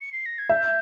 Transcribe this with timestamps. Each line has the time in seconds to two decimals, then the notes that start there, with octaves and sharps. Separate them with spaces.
0.00 C#7
0.12 C7
0.26 A#6
0.38 G#6
0.49 E5 G6